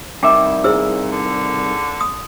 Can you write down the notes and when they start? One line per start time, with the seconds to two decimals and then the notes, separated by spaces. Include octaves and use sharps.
0.23 C2 G2 D#3 E5 G5 D6
0.64 A#2 E4 G#4 C5 E6
1.12 D3
2.01 D#6